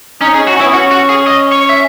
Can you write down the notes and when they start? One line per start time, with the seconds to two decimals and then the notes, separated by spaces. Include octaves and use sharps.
0.21 C#4 D#4
0.34 G#4
0.39 C#4
0.47 F#4
0.55 C#4
0.60 E4
0.64 B3
0.73 C#4 F#4
0.91 F#4
1.09 G#4
1.27 D#5
1.52 C#5
1.69 E5